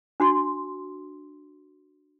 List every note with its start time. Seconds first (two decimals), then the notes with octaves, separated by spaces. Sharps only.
0.20 D4 F#4 C6